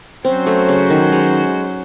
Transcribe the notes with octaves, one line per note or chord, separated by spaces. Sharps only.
F#3 C4 C#4 F#4 C5
A3
C#3
D#3
G#3